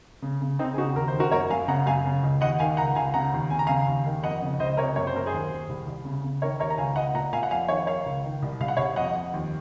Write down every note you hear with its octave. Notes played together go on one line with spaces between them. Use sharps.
C#3
C#3
C#3 C4 D#4
G#4
C#3 D#4 F#4
D#2 A#4
C5
D#3
F#4 A#4
F#2 A#4 C#5
F#2 F5 G#5
C#3 F#5 A#5
F#2 F5 G#5
C#3
C#2
D#2 D#5 F#5
D#3 F5 G#5
C#2 F#5 A#5
C#2 F5 G#5
C#3 F#5 A#5
D#2
C#3 G#5
A#5
C#3 F5 G#5
D#2
D#3
F2 D#5 F#5
C#3
C#2 C5 D#5
D#5
C3 A#4 C#5
F#2 C#5
C5
F#2 A#4
G#4 C5
D#2
D#2
C2
C2
C#3
C#3
D#3 A#4 C#5
D#2 A#4 C#5
A#5
C#2 F5 G#5
C#2 D#5 F#5
A#2 F#5 A#5
A#2 F5 G#5
F#5
F2 F5 G#5
D#3 C#5 F5
D#3 C#5 F5
C#2
D#3
C2
C2 F5
F#5
C2 C#5 F5
F2 D#5 F#5
F2
D#2